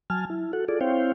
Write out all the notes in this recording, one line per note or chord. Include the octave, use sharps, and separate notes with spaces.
F#3 G#5 A5 F6
E4
F#4 A4 F#5
F4 G#4 A4 D5
C4 E4 C5 C#5 F5 G5